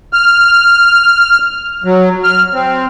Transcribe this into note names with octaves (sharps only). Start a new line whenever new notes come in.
F6
F#3
F6
C4